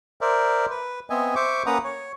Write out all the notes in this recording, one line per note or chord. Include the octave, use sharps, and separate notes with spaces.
A#4 C5 D5 E5
B4
B3 C4 D#5 E5 G#5
C5 E5 C#6 D6
A#3 C#4 B4 F#5 A#5 D#6
C#5